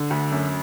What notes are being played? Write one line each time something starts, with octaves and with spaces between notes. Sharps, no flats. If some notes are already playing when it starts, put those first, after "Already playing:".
Already playing: D3
D2
F#2